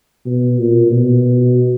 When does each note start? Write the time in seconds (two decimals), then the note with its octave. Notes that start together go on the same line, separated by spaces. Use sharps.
0.26 B2
0.58 A#2
0.91 B2